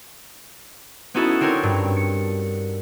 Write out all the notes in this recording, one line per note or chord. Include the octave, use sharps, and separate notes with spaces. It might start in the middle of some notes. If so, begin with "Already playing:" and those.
B3 C#4 D#4 E4 F#4 A4
C4 D4 D#4 A#4 C#5
G2
C#7